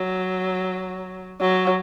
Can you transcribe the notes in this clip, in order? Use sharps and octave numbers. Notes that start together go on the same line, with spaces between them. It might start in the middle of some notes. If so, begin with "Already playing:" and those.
Already playing: F#3
F#3